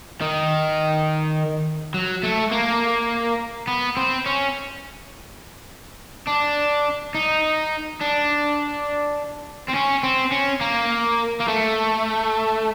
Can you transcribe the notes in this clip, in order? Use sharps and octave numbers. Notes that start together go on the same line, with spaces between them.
D#3
F#3
A3
A#3
B3
C4
C#4
D4
D#4
D4
C4
C#4
C4
C#4
A#3
A#3
A3